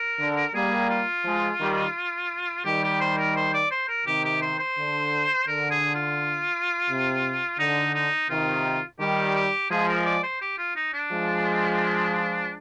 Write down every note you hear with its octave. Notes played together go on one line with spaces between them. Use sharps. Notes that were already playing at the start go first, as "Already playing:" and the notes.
Already playing: A#4
D3
G3 A#3 G#4
F4
F3 G#3
D#3 G3
D#3 G3 G4
G4
C5
A#4
C5
D5
C5
A#4
C3 D#3 G4
G4
C5
C5
D3
D3 A#4
G#4
F4
C3
D3 D#4
D#4
C3 D#3 F4
D#3 G3 G4
G4
F3 G#3 G#4
A#4
D5
C5
G4
F4
D#4
D4
F3 G#3